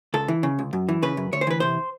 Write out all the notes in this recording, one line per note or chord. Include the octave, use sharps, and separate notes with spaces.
C#2 A4
E3
C#3
C#2
F#2
E3
C#3 B4
F#2
D2 C#5
C5
E3 B4
C3 C5